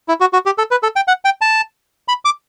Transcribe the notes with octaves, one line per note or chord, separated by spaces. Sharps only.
E4
F#4
F#4
G4
A4
B4
A4
G5
F#5
G5
A5
B5
D6